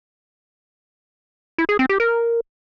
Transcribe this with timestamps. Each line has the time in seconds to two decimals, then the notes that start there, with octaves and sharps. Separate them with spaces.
1.58 E4
1.69 G#4
1.79 C4
1.89 G4
2.00 A#4